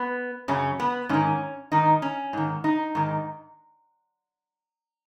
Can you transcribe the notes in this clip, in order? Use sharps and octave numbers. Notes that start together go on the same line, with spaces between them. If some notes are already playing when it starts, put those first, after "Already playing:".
Already playing: B3
F#2 C#3 C#4
B3
G#2 D#3 C#4
G#2 D#3 D#4
C#4
G#2 D#3
D#4
G#2 D#3